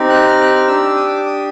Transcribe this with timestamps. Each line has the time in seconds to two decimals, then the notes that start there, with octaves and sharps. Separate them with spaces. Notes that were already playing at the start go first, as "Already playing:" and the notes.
Already playing: C4 D#4 G4
0.09 F#6
0.28 F6
0.41 F#6
0.55 F6
0.67 D4 G4 E6
0.96 D#6
1.06 D6
1.26 D#6